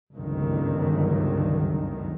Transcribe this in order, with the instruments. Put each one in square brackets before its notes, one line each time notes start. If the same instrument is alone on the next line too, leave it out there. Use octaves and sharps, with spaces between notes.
[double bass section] G1 C#2 F#2 D3 D#3